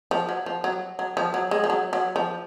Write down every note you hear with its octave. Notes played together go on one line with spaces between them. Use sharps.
F3
F#3
F3
F#3
F#3
F3
F#3
G#3
F3
F#3
F#3
F3